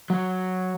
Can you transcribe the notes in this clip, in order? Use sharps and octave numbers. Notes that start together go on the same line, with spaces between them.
F#3